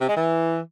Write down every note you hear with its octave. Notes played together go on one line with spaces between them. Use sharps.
C3
G#3
E3